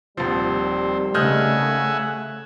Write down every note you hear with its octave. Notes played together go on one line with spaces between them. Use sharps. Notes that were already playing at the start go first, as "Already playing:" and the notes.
D#1 C3 D#3 F3 G3 C4
C#3 A3 D#5 E5 F#5 G#5 F6 G6